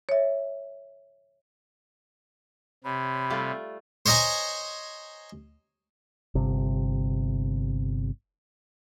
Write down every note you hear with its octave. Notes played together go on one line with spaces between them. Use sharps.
C#5 E5
C3 C#5 B5
G3 A3 F4
C5 C#5 D#5 G#5 A#5
G1 C3